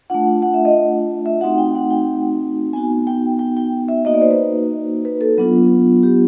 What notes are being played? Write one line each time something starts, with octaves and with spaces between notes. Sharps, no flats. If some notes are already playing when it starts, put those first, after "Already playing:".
A3 D4 F4 F#5
F#5
E5
D#5
E5
A3 C4 D#4 F#4 F#5
G5
F#5
G5
B3 D#4 F#4 G#5
G5
G5
G5
E5
A#3 D#4 F#4 D#5
D5
C5
B4
B4
A4
F#3 B3 D4 F4
G4